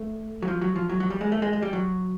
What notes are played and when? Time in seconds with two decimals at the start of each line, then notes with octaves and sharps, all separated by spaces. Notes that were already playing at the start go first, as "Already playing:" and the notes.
Already playing: A3
0.42 F#3
0.48 F3
0.61 F#3
0.75 F3
0.89 F#3
1.00 F#3
1.10 G3
1.21 G#3
1.32 A3
1.42 G#3
1.53 G#3
1.62 G3
1.73 F#3